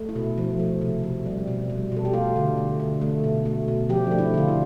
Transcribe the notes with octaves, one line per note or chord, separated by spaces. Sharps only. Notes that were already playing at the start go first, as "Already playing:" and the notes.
Already playing: A3
E4
B2
F3
A3
C3
C3
G3
B2
G3
B2 A4
G4
A3 F4
D3
A3
D3
A3
B2
A3
B2
F3 G4
A3 D4
E4
D3 F4
E4